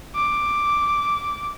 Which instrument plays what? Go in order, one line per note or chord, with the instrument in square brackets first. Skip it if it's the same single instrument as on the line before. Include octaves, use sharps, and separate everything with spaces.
[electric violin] D6